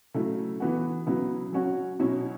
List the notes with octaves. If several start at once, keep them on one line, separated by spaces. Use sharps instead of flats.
C#3 F#3 A3 E4
E3 B3 F#4
C#3 F#3 B3 E4
F#3 C#4 F#4
B2 F#3 C#4 E4